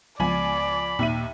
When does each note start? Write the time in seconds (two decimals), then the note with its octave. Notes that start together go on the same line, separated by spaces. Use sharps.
0.20 C#2 F3 G#3 B3 D5 G#5 B5
0.99 D#2 A#2 A#3 E5 D#7